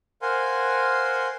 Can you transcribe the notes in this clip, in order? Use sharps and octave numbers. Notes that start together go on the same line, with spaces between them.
A#4 C5 F5 F#5 G#5 C6